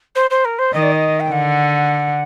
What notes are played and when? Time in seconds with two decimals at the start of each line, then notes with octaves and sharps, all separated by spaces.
0.15 C5
0.30 C5
0.44 A#4
0.58 C5
0.73 D#3 D#5
0.82 D5
0.91 D#5
1.20 G5
1.30 D3 F#5